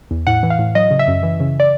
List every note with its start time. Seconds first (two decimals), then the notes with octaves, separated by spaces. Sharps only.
0.11 E2
0.27 A2 F#5
0.43 E3
0.50 F5
0.59 A2
0.75 F#3 D#5
0.91 C#3
0.99 E5
1.08 F#2
1.23 E3
1.40 C#3
1.60 D5